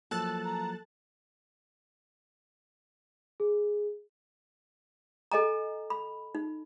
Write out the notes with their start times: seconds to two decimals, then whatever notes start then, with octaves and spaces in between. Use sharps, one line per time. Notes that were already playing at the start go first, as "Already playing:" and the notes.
0.11 F3 F#3 A#3 A4 A5 F#6 A6
0.45 A#5
3.40 G#4
5.32 A4 D#5 G#5 A#5
5.90 B5
6.35 D#4